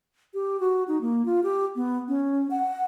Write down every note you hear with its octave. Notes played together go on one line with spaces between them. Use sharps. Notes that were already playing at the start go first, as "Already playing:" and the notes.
G4
F#4
D#4
A#3
F4
G4
B3
C#4
F#5